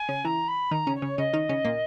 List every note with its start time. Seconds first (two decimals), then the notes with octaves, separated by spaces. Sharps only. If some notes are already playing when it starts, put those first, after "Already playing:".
Already playing: G#5
0.09 C#3 C#4
0.25 E3 E4 A#5
0.48 B5
0.71 D#3 D#4 A#5
0.87 C#3 C#4
0.95 C#5
1.02 C#3 C#4
1.18 C#3 C#4 D#5
1.33 D#3 D#4
1.49 C#3 C#4
1.65 A#2 A#3